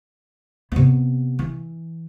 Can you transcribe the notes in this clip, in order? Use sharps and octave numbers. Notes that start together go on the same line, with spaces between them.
C3 B3
E3